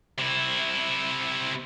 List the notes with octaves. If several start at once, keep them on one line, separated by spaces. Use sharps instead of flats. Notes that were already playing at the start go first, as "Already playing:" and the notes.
C3 E4